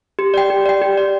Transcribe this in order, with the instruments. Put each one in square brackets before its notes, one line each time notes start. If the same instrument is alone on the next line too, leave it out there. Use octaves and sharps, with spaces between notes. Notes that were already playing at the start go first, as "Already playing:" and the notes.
[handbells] G4
D5 G5
G4
D5 G5
G4
D5 G5